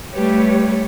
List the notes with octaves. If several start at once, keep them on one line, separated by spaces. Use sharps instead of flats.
G3 A3 G4 B4 C#5